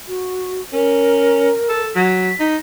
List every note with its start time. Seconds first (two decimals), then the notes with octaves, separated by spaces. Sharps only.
0.07 F#4
0.73 C#4 A#4
1.69 A4
1.96 F#3 B6
2.40 D#4